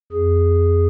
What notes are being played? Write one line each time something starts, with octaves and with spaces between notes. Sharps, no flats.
F2 G#4